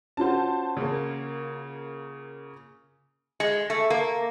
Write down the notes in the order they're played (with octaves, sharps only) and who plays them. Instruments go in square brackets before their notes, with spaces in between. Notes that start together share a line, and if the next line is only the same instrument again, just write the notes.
[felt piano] C#4 F4 F#4 [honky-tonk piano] C5 A5
[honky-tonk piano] C#3 A#3
[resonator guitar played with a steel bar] G#3
A3
A#3